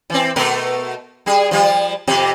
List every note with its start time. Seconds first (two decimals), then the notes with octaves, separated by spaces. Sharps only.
0.10 E3 C4
0.36 B2 A3 A#4
1.26 G3 G#4
1.51 F3 G3 F4
2.07 F2 C3 G4